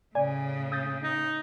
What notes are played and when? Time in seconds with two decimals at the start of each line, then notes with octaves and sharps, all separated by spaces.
0.15 A2 C#3 D5 G#5
0.72 D#6 G6 A6
1.03 D#4